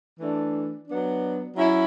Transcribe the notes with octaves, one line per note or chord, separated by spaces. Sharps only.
E3 A3 D4
F#3 B3 D4
F#3 C#4 E4